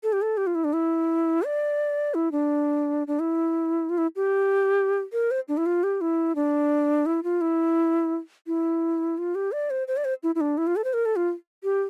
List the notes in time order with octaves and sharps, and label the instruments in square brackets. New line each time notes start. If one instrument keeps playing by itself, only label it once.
[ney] A4
G4
A4
G4
F4
E4
D4
E4
D5
E4
D4
D4
E4
F4
E4
G4
A#4
C5
D4
E4
F4
G4
E4
D4
E4
F4
E4
E4
F4
G4
D5
C5
C5
D5
C5
E4
E4
D4
E4
F4
A4
C5
A#4
A4
F4
G4